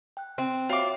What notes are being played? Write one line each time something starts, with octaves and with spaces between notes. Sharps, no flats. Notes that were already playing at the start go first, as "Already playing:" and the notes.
G5 F#6
C4
F4 F#4 C#5 E5 F5 D6